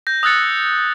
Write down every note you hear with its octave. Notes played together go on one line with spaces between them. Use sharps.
G6 A#6
D#6 E6 F#6 A6 C#7